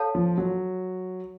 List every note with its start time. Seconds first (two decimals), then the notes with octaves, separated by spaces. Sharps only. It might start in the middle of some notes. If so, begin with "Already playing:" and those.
Already playing: A4 C#5 F5 A5
0.15 F3
0.38 F#3